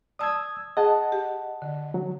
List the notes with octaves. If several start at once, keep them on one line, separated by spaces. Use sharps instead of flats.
D5 A5 D#6 E6 G#6
G#4 D#5 F#5 A5
G4
D3
F#3